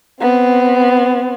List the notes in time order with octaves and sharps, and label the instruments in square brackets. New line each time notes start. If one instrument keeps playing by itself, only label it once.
[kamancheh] B3 C4